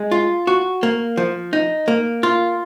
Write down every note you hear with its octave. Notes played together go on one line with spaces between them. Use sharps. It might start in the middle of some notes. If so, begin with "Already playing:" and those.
Already playing: G#3
F4
F#4
A#3
F3
D#4
A#3
F4